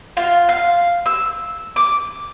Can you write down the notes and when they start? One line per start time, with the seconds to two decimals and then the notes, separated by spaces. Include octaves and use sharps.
0.17 F4
0.49 F5
1.06 E6
1.76 D6